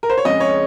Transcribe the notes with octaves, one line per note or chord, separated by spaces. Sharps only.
A#4
C5
C#5
F2 C#3 G#3 D#5
C#5